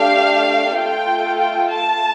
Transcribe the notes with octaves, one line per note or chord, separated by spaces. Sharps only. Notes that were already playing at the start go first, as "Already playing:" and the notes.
Already playing: A3 D4 G4 F5
A3 F4 A4 G5
G5
A5